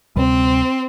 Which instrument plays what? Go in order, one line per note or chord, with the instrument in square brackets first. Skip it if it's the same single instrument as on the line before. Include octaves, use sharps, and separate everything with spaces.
[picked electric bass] D2 C3 G3 [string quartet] C4